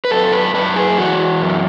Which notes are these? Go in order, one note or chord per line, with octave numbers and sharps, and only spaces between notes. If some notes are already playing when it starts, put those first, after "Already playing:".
B4
F#2 A4
B4
F#2 B4
G#4
E3 F#4
F#2